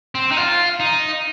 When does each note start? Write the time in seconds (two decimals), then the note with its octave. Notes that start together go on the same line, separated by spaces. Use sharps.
0.15 C4
0.31 D#4
0.37 F4
0.80 D#4